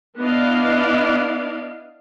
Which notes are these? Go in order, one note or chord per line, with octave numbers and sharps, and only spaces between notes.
B3 D4 E4 D5 D#5 F5